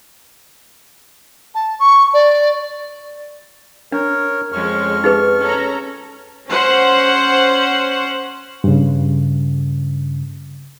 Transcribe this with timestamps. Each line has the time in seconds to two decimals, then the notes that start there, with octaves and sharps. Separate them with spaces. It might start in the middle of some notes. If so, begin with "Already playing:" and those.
1.55 A5
1.80 C#6
2.14 D5
3.92 D4 A#4 C#5
4.52 F2 F3 G#3 C#4 C#6 F6
5.04 D#4 G#4 B4
5.41 C#4 A4 A#5
6.48 C#4 C5 F#5
8.64 G2 C#3